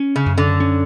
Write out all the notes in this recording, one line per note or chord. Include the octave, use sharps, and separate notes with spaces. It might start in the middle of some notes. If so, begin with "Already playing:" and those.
Already playing: C#4
C#3
F#2
D3
C#4